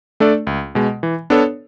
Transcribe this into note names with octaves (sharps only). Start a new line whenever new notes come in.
A3 D4 A4 D5
C#2
B2 G#3
E3
B3 D4 A4 C#5